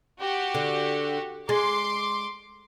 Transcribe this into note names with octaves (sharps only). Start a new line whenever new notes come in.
F#4 G4
D3
G#3 C6 D6